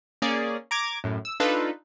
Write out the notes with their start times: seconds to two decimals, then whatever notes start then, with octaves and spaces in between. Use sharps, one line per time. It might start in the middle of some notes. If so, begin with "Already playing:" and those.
0.22 A#3 C#4 G#4 D5
0.71 A#5 D6 G#6
1.04 F#2 A2
1.25 E6
1.40 D4 D#4 F4 A4 B4